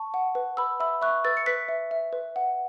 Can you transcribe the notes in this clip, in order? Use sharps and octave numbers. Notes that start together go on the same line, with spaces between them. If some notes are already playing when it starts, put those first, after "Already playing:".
Already playing: A5 C#6
F#5
B4
B4 B5 E6
E5 B5 E6
E5 C#6 F#6
B4 E6 A6
C#7
B4 F#6 B6
E5
E5
B4
F#5